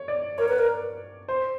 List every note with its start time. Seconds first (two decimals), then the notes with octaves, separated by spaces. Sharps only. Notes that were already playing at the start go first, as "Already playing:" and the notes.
Already playing: C#5
0.08 D5
0.38 A#4 C#5
0.48 B4
0.58 A#4
1.28 C5